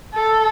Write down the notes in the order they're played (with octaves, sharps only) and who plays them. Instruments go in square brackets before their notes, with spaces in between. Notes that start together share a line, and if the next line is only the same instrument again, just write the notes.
[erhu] A4